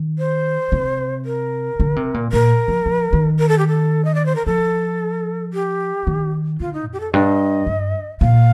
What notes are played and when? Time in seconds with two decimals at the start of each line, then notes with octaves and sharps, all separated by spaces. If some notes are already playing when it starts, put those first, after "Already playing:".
Already playing: D#3
0.19 C5
0.72 C3
1.25 A#4
1.80 D3
1.96 C3
2.14 A#2
2.32 A#2 A#4
2.68 F3
2.86 F3
3.13 D#3
3.39 A#4
3.49 A4
3.58 G4
3.68 A4
4.05 D#5
4.15 D5
4.26 C5
4.36 A#4
4.46 F3 A4
5.53 G4
6.07 D#3
6.60 D3 F4
6.73 D#4
6.87 F2
6.93 G4
7.00 A4
7.13 G2 D#5
7.67 G2
8.21 A#2 F5